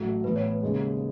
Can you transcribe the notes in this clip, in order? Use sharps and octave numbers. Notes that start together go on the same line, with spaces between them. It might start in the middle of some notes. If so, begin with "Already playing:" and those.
Already playing: A1 A2 F#3 A4
A2 E3 B3 B4
C#5
B4
D#2 C#3 G#3 B3